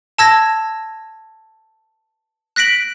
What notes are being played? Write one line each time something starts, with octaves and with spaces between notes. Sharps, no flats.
A5 E6 G#6 A#6
F#6 A#6 B6 D7 F#7